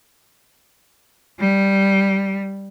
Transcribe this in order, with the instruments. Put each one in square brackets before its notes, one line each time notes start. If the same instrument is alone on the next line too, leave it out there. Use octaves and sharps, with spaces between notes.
[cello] G3